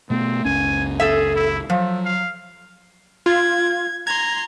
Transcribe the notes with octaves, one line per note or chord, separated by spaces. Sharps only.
B2 A3 B3 C4
F#1 C#2 C#4 G#5
G#4 A4 E5
E4
F3 F#3 A3
F5
F4 G#6
A#5 C6 G#6